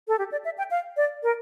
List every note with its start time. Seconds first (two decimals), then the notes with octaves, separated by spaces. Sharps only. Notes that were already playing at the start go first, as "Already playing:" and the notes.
0.08 A4
0.19 G4
0.32 D5
0.45 E5
0.58 G5
0.71 F5
0.97 D5
1.23 A#4